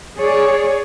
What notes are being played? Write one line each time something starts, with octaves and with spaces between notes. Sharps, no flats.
G#4 C#5 D5